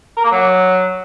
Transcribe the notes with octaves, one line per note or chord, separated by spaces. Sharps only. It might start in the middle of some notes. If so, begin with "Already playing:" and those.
A#4
A#3
F#3